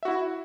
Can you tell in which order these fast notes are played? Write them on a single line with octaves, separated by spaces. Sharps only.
E5 F#4 E4